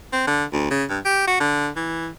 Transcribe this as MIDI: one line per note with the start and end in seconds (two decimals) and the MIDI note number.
0.13 0.26 60
0.27 0.44 50
0.53 0.69 38
0.70 0.84 49
0.89 0.99 43
1.05 1.26 67
1.27 1.38 66
1.40 1.69 50
1.76 2.08 52